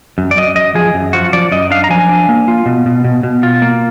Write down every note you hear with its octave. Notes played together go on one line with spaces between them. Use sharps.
F#2
D5
F#2 D#5
F#2 D#5
F3 G#4
F#2
F3 F#4
F3 D5
F#2 D#5
D4 F5
A#5
F3 G#5
D4
A#3
F4
B2
B2
B2
B2
F4
A#3